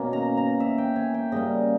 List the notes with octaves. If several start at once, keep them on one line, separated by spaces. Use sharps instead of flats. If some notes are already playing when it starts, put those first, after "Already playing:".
Already playing: B2 A#3 C#4
A#5
A#5
E5
G5
G#5
G5
C#3 G3 A#3 D#5